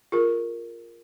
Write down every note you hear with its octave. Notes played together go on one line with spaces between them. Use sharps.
F4 G#4 A#4